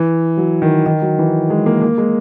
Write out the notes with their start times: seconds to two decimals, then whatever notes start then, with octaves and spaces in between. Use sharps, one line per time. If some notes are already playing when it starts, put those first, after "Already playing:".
Already playing: E3
0.37 F#3
0.62 D#3
0.86 D#3
1.02 F#3
1.19 E3
1.50 G#3
1.66 A#3
1.82 A#3
1.98 G#3